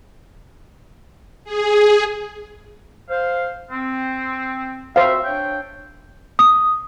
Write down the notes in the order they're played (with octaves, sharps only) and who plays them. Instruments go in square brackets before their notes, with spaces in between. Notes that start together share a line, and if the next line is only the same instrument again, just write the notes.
[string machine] G#4
[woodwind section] C5 F5
C4
[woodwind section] F#4 E5 [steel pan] C5 F5
[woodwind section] D4 C#5 G5
[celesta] D#6